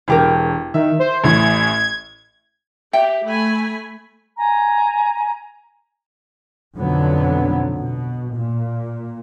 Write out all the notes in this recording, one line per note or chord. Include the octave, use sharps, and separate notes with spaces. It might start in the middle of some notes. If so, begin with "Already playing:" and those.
E1 E4 G4 A#4
D#3 E5
C5
A1 A2 G#6
G4 E5 G5
A3 G#5 B5
G#5 A#5
B1 F2 B2 D3 F#3 B3
B2
A#2